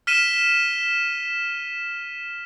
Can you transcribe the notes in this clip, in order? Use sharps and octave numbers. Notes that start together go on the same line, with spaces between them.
F6 B6 D#7 E7 G7